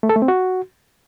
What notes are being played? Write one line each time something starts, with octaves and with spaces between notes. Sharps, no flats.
A3
A4
A3
C4
F#4